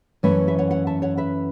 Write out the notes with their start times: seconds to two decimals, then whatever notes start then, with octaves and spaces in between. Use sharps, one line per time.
0.23 F#2 E3 A3 C#4 B4 E5
0.47 B4 E5
0.58 C#5 F#5
0.71 C#5 F#5
0.87 E5 A5
1.02 C#5 F#5
1.17 B4 E5